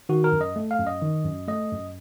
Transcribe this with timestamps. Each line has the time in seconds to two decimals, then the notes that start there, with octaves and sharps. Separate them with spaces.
0.09 D#3 F#4
0.24 A#4
0.32 F#2
0.41 D#5
0.56 A3
0.71 F5
0.79 F#2
0.87 D#5
1.02 D#3
1.25 F#2
1.48 A3 D#5
1.72 F#2